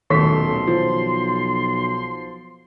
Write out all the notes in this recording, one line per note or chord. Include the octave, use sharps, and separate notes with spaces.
D#1 B1 D#3 A3 C6 B6
F3